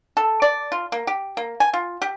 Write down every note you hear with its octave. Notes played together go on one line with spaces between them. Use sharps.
A4
D5
F4
A#3
G4
A#3
G#5
F4
G4